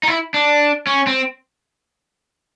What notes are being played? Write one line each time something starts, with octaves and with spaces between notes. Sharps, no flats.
D#4
E4
D4
C#4
C4